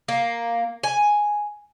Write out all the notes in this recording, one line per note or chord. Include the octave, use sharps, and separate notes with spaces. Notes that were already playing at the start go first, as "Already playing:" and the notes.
A#3
G#5